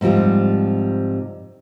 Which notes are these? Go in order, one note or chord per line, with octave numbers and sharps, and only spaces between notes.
G#2 C3 F3 G3